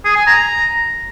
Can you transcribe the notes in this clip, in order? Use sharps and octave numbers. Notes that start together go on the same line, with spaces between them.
G#4
G#5
A#5